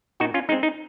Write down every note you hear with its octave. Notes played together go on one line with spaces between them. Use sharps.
A#2 D#4 F#4
C#4 F4
G#3 C4 D#4
D#4